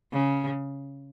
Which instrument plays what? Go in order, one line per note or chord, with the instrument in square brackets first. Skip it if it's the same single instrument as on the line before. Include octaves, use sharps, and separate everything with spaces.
[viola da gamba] C#3